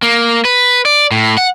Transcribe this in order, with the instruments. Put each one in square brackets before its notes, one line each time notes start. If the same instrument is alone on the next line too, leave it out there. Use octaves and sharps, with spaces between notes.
[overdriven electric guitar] A#3
B4
D5
A2
F#5